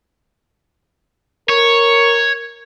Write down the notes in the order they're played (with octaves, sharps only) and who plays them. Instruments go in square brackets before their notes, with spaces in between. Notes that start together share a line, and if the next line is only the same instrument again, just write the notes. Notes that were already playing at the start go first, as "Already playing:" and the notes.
[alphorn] A#4 [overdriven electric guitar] C#5